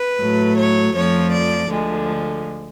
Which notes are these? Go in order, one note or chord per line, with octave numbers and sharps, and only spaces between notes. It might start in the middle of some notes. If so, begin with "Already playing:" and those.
Already playing: B4
A2 F#3 A3
C#5
F2 F3 A3 C#5
D5
D2 D3 F3 G#3